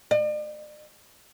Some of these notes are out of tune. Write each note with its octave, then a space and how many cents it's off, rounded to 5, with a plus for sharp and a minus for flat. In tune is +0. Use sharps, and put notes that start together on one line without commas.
D5 +45